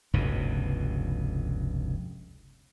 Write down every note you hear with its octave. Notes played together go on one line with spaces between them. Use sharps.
F1 C#2 G2 B2